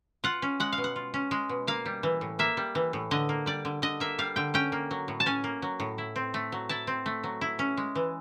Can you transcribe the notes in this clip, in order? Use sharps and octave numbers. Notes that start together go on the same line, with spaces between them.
F4 F#5
C#4
G#3 F#5
F5
B2
F#5
F4
C#4
G#3
B2
A#3 F5
G3
E3
A2
A#3 E5
G3
E3
A2
D3 D#5
A#3
G3 D5
D3
D3 D#5
A#3 E5
G3 F5
D3 G5
C#4 G5
A#3
F#3
A2
A5
C#4 G#5
A#3
F#3
A2
E4
C4
A3
F#3
E4 A5
C4
A3
F#3
E4
C#4
G#3
E3